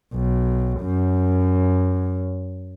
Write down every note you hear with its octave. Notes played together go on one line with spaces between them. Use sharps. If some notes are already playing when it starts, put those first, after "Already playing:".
B1
F#2